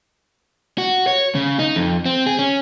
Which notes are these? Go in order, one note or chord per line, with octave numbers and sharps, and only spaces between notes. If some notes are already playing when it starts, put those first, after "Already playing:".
F#4
C#5
C#3
D#4
F2
C4
G#4
C#4